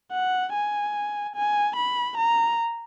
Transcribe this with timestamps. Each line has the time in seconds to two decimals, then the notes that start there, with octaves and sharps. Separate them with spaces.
0.12 F#5
0.53 G#5
1.36 G#5
1.77 B5
2.18 A#5